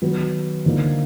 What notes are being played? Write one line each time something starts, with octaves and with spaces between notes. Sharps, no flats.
D#3 F#3 B3
D3 F3 A#3 D#4